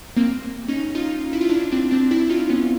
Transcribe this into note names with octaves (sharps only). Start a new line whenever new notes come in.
A#3 C4
C#4 D#4
D#4 F4
E4
F4
D4 E4
C4 D4
C4 D4
D4 E4
D#4 F4
B3 C#4